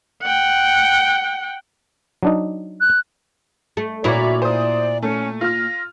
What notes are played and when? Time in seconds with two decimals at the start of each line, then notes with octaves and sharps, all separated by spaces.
0.22 F#5 G5
2.23 F#3 D4 D#4
2.81 F#6
3.77 A3
4.04 A#2 E4 F#4 C#5 D5 E5
4.42 C5 D5 D#6
5.03 A3 C#4
5.41 F4 F6 A#6